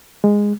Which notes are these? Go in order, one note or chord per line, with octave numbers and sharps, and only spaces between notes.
G#3